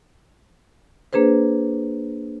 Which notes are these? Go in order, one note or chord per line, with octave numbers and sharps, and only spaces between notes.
A#3 D4 G#4 B4 C5